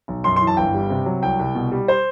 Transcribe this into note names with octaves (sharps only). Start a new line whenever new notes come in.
B1
F#2 C6
C6
E3
A5
G1 G5
G3
C3
F#3
C2 G5
C2
B2
G3
C5